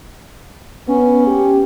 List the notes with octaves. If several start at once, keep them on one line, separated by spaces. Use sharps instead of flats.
B3 C#4
G4